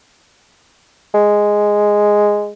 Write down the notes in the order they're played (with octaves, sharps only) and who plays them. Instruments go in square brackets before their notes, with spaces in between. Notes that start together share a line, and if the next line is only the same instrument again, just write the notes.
[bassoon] G#3